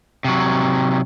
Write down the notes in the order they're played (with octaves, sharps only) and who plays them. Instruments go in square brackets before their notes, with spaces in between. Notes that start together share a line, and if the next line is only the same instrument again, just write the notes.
[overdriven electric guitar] C3 F#3